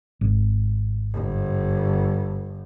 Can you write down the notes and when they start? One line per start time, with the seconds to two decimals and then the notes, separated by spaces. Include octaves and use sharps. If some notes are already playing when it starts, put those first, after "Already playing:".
0.21 G#1
1.12 G1